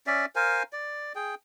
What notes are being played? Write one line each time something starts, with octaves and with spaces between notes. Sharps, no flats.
C#4 D5 E5
A#4 C5 F5 G#5
D5
G#4 G5